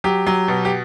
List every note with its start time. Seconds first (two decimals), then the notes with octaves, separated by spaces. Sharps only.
0.04 F#3 G4
0.27 F#3
0.48 B2
0.65 G4